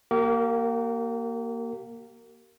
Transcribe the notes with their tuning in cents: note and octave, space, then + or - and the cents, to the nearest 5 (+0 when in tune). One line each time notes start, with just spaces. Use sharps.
A#3 +10 G4 -35 A#4 -20